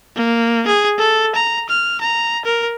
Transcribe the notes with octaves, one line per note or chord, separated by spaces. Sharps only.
A#3
G#4
A4
A#5
F6
A#5
A#4